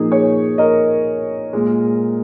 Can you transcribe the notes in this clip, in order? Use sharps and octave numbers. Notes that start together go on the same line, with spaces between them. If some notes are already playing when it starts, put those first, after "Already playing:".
Already playing: A#2 F3 A#3 D#4 G#4
G#4 C#5
A#4 D#5
A#2 G#3